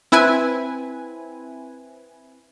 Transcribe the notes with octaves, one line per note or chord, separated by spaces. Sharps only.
C4 E4 B4 G#5